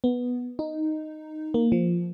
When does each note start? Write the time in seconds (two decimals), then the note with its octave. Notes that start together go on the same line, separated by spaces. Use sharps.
0.04 B3
0.59 D#4
1.54 A#3
1.72 F3